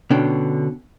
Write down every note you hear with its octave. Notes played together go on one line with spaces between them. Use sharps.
B2 D3 C#4 D4 G5